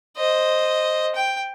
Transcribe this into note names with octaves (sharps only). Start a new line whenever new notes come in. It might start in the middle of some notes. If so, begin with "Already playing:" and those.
C5 D#5
G5